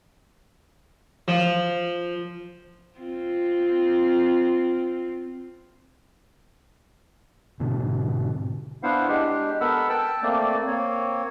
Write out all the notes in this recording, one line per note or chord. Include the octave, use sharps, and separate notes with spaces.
F3
C4 F4
G#2 B2 D3 C4
B3 D4 E4 C5 F5 F#5
G#3 D4 G4
B3 A4 A#4 F#5 B5 E6
G5 A5 E6
A3 A#3 C4 D5
A#3 C4 C#5